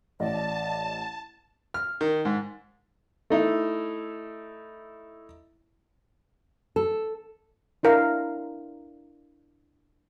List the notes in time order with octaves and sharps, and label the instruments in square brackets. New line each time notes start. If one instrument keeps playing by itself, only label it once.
[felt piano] A1 [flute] D5 [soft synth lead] D#5 [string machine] A5
[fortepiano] F6
D#3
G#2
A3 D#4 E4
[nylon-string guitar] A4
[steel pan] D4 E4 A#4 F5 A#5